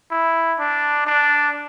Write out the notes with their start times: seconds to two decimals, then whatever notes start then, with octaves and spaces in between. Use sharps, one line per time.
0.11 E4
0.59 D4
1.07 D4